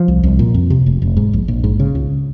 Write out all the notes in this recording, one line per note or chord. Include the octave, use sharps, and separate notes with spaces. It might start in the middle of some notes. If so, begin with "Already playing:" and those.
Already playing: F3
C2
C2
A#2
F2
C3
F1
F1
G#2
A#1
A#1
G#2
C#3
C#2